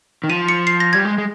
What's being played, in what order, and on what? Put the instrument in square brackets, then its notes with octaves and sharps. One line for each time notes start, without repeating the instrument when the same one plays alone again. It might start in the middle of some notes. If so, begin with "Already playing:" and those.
[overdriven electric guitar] D#3
[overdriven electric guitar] F3 [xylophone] D#7
[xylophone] C#7
C7
A#6
[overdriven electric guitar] G3 [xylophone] G#6
[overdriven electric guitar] G#3
G#3